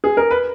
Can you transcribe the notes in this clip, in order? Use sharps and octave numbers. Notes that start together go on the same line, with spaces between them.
G#4
A#4
B4